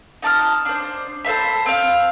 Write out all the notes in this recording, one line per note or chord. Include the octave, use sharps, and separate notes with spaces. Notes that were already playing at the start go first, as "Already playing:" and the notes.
D#4 A5 D6 F6
D4 C5
A4 C5 E5 B5
C4 F5